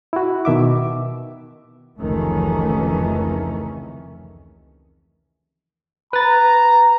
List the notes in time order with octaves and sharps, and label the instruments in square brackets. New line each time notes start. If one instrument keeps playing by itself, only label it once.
[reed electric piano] E4 F#4
B2 D#3 E5 D6
[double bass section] F1 C#2 D#3 E3 A3 C#4
[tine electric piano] B4 A6 [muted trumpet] A#5